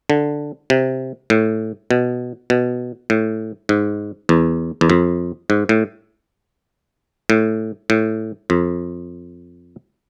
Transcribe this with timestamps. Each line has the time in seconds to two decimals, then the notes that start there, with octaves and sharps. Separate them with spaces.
0.10 D3
0.70 C3
1.30 A2
1.91 B2
2.50 B2
3.10 A2
3.69 G#2
4.29 E2
4.81 E2
4.90 F2
5.50 G#2
5.69 A2
7.30 A2
7.90 A2
8.50 F2